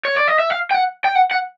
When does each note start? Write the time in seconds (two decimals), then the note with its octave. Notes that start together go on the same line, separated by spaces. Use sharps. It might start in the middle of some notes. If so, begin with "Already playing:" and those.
0.05 C#5
0.17 D5
0.28 D#5
0.39 E5
0.50 F5
0.71 G5
0.74 F#5
1.04 G5
1.15 F#5
1.31 F#5